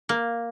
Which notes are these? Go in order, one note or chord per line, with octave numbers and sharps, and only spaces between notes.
A#3